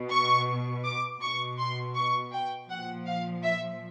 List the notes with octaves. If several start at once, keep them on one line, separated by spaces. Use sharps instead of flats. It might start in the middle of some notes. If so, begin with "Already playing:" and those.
Already playing: B2
C#6
D6
B2 C#6
C6
C#6
G5
A#2 F3 F#5
F5
E5